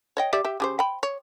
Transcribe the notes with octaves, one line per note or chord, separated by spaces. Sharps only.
C#5 D#5 G5
G4 D5 E5
G4 E5
C#3 G4 C5
G5 B5
C#5